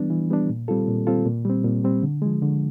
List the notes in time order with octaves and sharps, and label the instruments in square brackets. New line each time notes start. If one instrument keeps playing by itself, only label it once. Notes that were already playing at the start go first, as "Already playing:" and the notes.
Already playing: [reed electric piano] E3 G3 B3 D4
E3
G3 B3 D4
A#2
G3 C4 F4 A4
A#2
G3 C4 F4 A4
A#2
G3 C4
A#2
G3 C4
D3
F3 G#3
D3